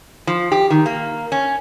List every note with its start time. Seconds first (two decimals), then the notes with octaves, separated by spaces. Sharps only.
0.27 F3
0.52 G4
0.70 D#3
0.86 A#3
1.32 C#4